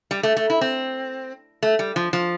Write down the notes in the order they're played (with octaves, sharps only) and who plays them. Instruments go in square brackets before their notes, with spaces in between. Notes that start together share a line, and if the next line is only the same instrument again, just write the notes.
[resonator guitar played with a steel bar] G3
A3
A3
E4
C4
A3
G3
F3
F3